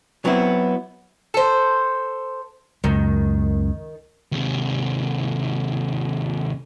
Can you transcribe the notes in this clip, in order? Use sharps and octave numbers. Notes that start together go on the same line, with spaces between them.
F#3 B3 C4 E4
A4 C5
C#2 F#2 D#3
D#2 C3